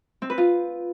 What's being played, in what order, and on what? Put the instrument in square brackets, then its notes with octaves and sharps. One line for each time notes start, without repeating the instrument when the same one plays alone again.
[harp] C4
B4
F4